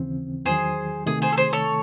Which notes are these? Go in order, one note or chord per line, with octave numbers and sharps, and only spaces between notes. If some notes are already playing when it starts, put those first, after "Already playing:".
Already playing: D#2 C#3 E3 C4
E2 D#3 F#3 G#4 C5
C3 D#3 A3 G#4
G#4 C5
A4
G#4 C5
A4 C#5